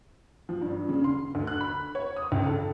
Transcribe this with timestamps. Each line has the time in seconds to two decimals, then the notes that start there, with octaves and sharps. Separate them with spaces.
0.49 F3
0.61 G2
0.89 C#3
1.04 C6
1.35 D2
1.47 F#6
1.61 B5
1.95 C#5
2.16 D#6
2.32 C#2
2.46 A4